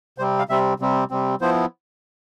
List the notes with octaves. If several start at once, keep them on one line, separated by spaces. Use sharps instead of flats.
C3 G3 C4 C5
F5
C3 G3 C4 E5
C3 G3 C4
C3 G3 C4
F3 B3 E4 C5